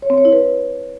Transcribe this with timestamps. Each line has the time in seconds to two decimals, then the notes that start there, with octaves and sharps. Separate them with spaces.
0.02 C#5
0.10 C4
0.18 C#5
0.25 E4
0.33 B4